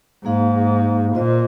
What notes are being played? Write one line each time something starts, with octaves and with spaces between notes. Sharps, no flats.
G#2 A#3 D#4 G#4 F5
A#2 F4 C5 D#5